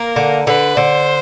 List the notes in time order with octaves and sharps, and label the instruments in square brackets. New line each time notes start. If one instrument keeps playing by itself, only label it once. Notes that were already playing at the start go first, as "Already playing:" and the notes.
Already playing: [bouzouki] A#3 [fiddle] A#4
[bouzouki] D3
[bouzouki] D3 [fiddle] B4
[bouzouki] D3 [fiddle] C5